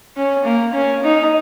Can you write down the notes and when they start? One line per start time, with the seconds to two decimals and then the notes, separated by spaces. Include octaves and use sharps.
0.17 C#4
0.45 A#3
0.74 C#4
1.03 D#4